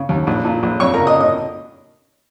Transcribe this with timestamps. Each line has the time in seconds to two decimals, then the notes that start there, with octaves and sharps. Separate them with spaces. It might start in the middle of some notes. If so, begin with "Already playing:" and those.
Already playing: C#3
0.09 D#2
0.27 A#1
0.45 A#2
0.63 A#1
0.80 F2 C#5 C#6
0.94 C#3 A#4 A#5
1.07 D#5 D#6
1.21 D#5 D#6